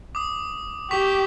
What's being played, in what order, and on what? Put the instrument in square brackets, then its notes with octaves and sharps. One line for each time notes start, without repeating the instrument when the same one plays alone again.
[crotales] D6 D#6
[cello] G4 [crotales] C#6 B6 F7